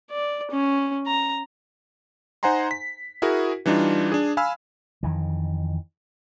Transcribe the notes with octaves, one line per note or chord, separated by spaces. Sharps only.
D5
C#4
A#5
D#4 C5 F#5 G#5 A#5 C6
B6
E4 F#4 G#4 A#4
E3 G3 D4 D#4 F4
D4 G#4
F5 G#5 B5 E6 F6
F2 D#3 E3